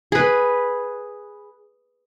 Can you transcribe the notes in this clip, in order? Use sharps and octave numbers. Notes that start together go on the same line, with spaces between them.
G#4 B4